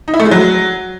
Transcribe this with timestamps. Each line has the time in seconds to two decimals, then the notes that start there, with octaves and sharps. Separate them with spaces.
0.08 D#4
0.14 E4
0.20 A3
0.25 G#3
0.31 F#3